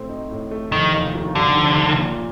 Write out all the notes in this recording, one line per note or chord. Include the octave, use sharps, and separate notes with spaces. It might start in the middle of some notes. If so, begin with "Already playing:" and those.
Already playing: A2 A3 C4
D#4
A2
A3
F1 D#3
D#2
D#3
D3 G3
F1
D#2
A#2